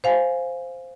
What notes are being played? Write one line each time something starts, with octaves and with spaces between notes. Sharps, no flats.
C5 F5 G#5